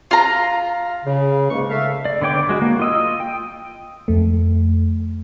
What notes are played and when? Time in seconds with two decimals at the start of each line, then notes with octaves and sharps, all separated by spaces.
0.11 F4 A#5
1.05 C#3
1.50 C#2 G#2 G#3 A#3 C#6
1.69 A3 E5 F5
2.05 D5
2.22 D3 B3 C#5 G5 D6
2.49 G#3 F#4
2.62 A#3
2.80 F4 D#5 E6
3.20 G5
4.08 F2 A3